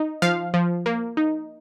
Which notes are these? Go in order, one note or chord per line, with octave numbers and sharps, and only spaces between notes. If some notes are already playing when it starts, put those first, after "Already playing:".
Already playing: D#4
F3 F5
F3
A#3
D#4